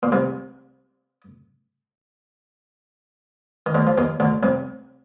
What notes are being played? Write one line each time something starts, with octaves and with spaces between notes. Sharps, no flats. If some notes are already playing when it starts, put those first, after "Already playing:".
A#2
C2 C3
D#3
D2 D3
F3
D#2 D#3
D2 D3
C2 C3